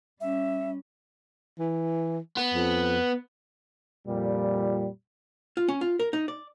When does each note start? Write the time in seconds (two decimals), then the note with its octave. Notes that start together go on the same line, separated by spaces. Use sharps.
0.21 G3 C#4 E5
1.59 E3
2.37 B3
2.54 F2
4.08 F2 A#2 G3
5.57 F4
5.68 C#4
5.81 F4
5.99 A#4
6.13 D#4
6.28 D5